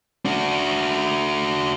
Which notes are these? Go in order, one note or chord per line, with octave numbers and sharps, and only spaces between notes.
D4 F#4